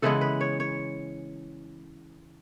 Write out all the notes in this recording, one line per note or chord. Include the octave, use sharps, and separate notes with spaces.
C#3 E3 G#3 B3 A4
B4
C#5
C#5